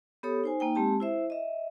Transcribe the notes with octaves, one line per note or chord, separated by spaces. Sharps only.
B3 G4 A4 C#5 D#6
D#4 C5 G#5
A#3 D#4 G5
G#3 C4 G4 A5
E4 C5 E5
D#5 E5